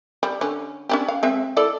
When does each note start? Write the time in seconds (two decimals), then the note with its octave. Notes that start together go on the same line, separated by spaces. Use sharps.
0.23 G3
0.41 D3 C#4
0.89 C#4 D4 G4
1.08 F5
1.23 G#3 C4 E5
1.57 E4 A4 D5